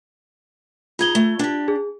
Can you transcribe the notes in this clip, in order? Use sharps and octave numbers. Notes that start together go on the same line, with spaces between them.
D#4 F4 G#4 A#5 G#6 G7
A3
D4 G4
G#4